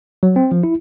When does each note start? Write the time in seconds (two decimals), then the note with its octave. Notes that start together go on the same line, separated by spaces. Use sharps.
0.23 F#3
0.36 C4
0.52 F3
0.63 E4